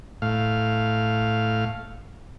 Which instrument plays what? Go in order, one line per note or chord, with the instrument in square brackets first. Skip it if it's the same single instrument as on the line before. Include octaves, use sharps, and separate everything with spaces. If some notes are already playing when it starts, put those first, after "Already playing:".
[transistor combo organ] A2 F5